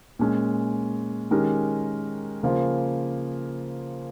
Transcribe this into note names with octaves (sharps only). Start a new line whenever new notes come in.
A#2 G#3 C#4
D#3 G#3 C#4 G4 A#4
C#3 F3 A#3 F4